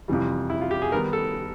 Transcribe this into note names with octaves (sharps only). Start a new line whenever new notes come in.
F2 C3 E3 G3
E4
F4
G4
G#4
D#3 G3 B3 D#4 A#4
A4